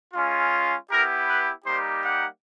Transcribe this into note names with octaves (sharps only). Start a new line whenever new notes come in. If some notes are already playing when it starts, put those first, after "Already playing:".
G#3 C#4 F4
B3 E4 G4 A#4
B4
G3 A#3 D#4 G4 C5
F#5